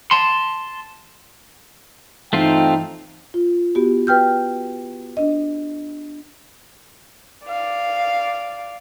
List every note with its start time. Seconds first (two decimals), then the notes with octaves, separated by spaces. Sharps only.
0.11 A5 C6
2.33 G2 E3 A3 C4 D#4 F4 G5
3.34 F4
3.75 B3 F#4 G4
4.07 B4 G5 F6 G6
5.17 D4 D#5
7.47 D5 F5